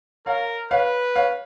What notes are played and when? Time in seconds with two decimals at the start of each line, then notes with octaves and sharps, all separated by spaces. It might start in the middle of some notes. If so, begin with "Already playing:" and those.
0.26 A#4 C#5 F5
0.71 B4 C#5 F5
1.16 C#5 F5